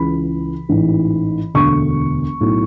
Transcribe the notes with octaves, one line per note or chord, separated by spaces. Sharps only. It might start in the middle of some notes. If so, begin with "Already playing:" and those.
Already playing: C#2 C#3 E3 B5
A1 G#2 E3
E1 D2 D3 C#6
B1 A2 F#3